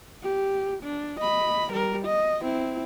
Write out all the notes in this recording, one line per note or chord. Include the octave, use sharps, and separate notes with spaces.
G4
D4
D#5 B5
G3 A#4
D#5
C4 E4